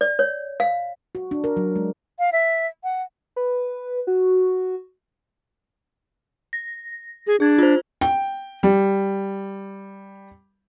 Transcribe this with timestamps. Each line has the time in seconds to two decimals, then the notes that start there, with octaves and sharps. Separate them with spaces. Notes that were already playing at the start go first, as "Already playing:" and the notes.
0.01 D5
0.19 C#5
0.60 F5
1.15 F#4
1.31 D4
1.44 A#4
1.57 F#3
1.76 G#3
2.19 F5
2.32 E5
2.84 F#5
3.36 B4
4.07 F#4
6.53 A#6
7.27 G#4
7.40 D4 G#4 G#6
7.58 F4 C5
8.01 G5
8.63 G3